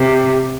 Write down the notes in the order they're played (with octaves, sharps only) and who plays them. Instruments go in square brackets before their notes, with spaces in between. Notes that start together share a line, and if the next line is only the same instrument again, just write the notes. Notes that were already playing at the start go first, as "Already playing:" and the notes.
Already playing: [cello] C3 [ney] G4